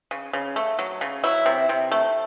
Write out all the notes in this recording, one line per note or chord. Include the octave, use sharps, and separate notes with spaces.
C#3
C#3
A3
F#3
C#3
F#3 E4
C3
C3
A3